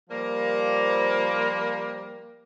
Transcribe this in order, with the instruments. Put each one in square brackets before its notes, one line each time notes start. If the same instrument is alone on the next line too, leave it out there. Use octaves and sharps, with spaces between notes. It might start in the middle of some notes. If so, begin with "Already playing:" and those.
[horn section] F3 G3 A#3